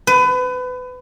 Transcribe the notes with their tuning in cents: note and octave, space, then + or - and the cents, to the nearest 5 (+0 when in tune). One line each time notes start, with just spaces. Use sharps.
B4 +30